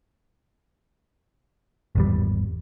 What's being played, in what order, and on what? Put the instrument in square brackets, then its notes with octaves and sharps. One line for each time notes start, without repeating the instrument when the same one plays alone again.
[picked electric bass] G#1 E2 G3